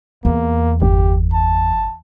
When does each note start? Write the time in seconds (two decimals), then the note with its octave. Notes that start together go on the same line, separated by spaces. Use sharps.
0.25 E2 A#3
0.82 G1 G4
1.33 A5